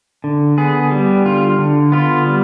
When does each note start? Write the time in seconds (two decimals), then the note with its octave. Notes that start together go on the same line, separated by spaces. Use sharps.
0.24 D3
0.58 B3 G#4
0.91 G3
1.26 D3 F4
1.58 D3
1.92 B3 F4
2.26 G3